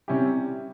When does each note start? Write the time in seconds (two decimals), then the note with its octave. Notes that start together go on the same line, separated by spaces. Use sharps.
0.08 C3 G3 C#4 E4 G4